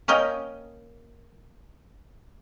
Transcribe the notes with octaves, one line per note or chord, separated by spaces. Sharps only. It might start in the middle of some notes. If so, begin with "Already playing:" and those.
A#3 C#4 A#4 D#5 G5